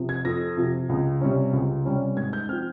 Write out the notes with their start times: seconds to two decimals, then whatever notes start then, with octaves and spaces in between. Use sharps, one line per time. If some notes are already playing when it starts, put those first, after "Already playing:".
Already playing: C3 F3
0.09 G#6
0.25 F2 A#6
0.57 C3 F3
0.89 C#2
1.21 C3 G3 C#4
1.53 C#2
1.85 C3 G3 C#4
2.17 G#2 G#6
2.33 G6
2.49 F3 C4 F6